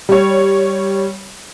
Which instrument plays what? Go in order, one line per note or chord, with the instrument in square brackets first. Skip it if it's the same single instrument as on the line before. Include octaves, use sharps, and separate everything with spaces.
[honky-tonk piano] G3 C#5